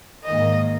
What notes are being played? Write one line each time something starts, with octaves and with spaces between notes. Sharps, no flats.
G#2 D#3 A#3 D#5